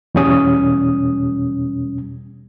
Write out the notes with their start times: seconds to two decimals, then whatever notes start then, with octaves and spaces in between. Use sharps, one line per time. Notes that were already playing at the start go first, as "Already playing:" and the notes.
0.15 E2 B2 G3 C#4 D#6